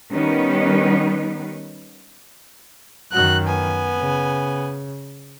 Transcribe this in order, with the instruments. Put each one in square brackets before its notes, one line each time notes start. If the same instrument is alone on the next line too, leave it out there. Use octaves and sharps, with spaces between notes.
[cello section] D#3 G3 B3 C#4 D#4 B4
[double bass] F#2 D#3 [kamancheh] F#4 F#6
[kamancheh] B3 G#5
[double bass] C#3